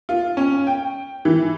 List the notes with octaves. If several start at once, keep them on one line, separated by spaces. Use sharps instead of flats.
F4
C#4
G5
E3